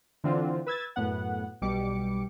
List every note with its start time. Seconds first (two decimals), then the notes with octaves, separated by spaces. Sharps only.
0.24 D3 E3 C4 D4 F4
0.66 B4 E6 G#6 A6
0.96 F#2 A2 B3 F#5
1.62 B1 B2 G3 D6 C#7